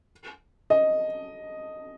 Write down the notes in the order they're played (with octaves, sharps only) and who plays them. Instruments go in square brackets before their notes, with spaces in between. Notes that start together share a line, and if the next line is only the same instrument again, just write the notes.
[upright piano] D#5